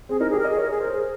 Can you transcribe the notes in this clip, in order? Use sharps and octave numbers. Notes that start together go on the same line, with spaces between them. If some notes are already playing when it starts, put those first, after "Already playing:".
C4 G#4
D#4 A#4
G4 G#4
A#4
D#5
G#4
A#4 C#5
G#4
A#4 C5
G#4